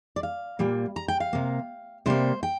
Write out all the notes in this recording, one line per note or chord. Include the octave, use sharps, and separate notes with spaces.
D5
F5
A#2 G3 A#3
A#5
G5
F5
C3 A#3
C3 G3 A#3 C5
G5